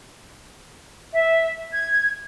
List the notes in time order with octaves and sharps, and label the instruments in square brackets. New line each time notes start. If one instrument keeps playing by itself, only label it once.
[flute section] E5
G#6